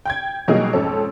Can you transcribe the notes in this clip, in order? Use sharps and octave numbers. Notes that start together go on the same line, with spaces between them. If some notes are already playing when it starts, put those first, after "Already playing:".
G5 G6 G#6
B2 F#3 G3 A#3 D#4 G#4
F2 G#2 C#4 A4